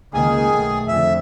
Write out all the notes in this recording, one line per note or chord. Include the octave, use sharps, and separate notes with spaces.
C#2 D#3 A#3 G#4
B1 A3
F2 D3 E5